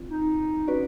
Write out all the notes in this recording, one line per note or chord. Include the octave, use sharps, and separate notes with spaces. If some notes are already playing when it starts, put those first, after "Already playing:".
Already playing: C4 F4
D#4
C#4 F#4 B4 D5